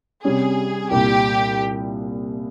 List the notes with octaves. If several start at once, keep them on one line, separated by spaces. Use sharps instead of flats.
C3 G3 C#4 G#4
C2 A#2 G3 G4